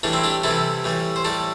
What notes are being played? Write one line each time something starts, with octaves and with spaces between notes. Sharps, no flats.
A2 E3 G3 D4
C4 E4
D4 G4
C3 E3 G3 E4 A4
A2 E3 G3
C5
A2 G3 A4 D5